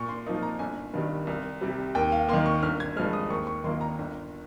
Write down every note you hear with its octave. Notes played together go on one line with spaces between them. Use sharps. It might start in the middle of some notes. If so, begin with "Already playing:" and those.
Already playing: A#2 C#6
C6
F3 A#3 D#4
A#5
G1 G#5
G2 D#3 G3
C2
C3 G3
D#2 G5
F5
D#3 A#3 C6
C#6
G1 F6
G#6
G2 F3 G#3 F6
D#6
D#2 C#6
C#6
D#3 A#3 F4 C6
A#5
G1